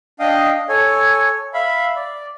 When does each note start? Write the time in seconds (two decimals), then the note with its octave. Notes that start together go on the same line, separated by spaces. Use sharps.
0.20 D4 D#5 F5 G5 D#6
0.69 A4 C#5 G#5
1.54 E5 F5 B5
1.96 D5